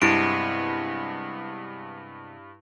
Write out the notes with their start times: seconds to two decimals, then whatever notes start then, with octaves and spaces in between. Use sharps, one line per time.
0.02 G2 C3 G#3 B3 E4 D7